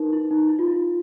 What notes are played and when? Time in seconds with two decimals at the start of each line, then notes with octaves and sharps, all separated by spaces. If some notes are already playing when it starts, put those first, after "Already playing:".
Already playing: D#4 A#4 B4
0.13 E4
0.31 D#4
0.49 E4
0.59 F4
0.68 E4